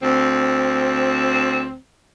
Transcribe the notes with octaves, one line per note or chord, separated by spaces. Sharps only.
D2 C4